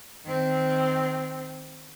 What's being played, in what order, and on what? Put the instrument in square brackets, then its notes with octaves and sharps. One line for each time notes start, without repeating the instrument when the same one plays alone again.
[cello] D#3 C4